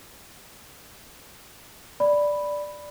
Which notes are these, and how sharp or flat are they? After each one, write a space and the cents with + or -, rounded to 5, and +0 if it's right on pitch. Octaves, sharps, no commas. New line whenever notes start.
D5 +0 B5 +0